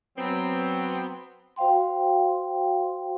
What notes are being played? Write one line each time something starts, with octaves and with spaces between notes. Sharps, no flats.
F#3 B3 C4
F#4 C5 F5 G5 C6